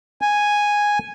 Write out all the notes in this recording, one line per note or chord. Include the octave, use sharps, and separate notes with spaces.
G#5